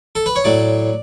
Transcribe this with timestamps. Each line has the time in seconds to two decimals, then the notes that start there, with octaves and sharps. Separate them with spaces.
0.15 A4
0.26 B4
0.36 C#5
0.44 A2 F#3 D5